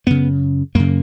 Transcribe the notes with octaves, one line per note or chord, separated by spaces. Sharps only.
F#2 C#3 B3
F#2 C#3 A#3